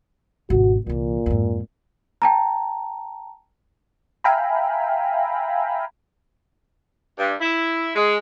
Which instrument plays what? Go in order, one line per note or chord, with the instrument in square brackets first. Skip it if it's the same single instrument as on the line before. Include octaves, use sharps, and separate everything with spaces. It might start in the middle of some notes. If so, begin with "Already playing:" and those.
[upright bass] G#1 B2 [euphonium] F#4
[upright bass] C2 E3 [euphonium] A#2
[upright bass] F2 G#2
[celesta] G5 A5 A#5
[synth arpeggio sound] E5 F5 G5 G#5 A#5 B5
[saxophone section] G2
E4
G#3